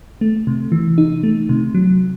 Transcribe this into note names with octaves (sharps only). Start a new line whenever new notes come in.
A3
C3
E3
D#4
A3
C3
F#3